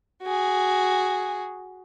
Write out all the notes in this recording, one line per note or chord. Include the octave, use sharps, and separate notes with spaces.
F#4 G#4